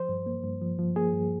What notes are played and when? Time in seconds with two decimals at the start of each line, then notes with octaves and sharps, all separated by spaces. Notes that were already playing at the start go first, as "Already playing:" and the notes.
Already playing: F3 C5
0.09 G2
0.26 A#3
0.44 G2
0.62 F3
0.79 F3
0.96 A#3 G#4
1.13 G2